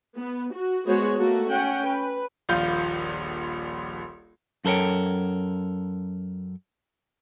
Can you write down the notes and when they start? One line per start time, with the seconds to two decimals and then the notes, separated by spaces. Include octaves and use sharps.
0.16 B3
0.53 F#4
0.86 G#3 B3 F#4 C5 C#5
1.18 A3 A#3 F#4 A4
1.49 C#4 F#5 G5
1.86 B4
2.49 D#1 A#1 F4 G6
4.65 F#2 A4 A#4 C#5 G5